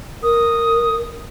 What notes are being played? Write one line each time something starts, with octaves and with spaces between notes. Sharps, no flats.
A#4 D#6